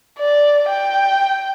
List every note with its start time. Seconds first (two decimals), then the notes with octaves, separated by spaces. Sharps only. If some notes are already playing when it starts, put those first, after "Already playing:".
0.19 D5
0.70 G5